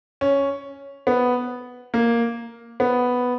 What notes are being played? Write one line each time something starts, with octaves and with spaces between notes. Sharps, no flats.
C#4
B3
A#3
B3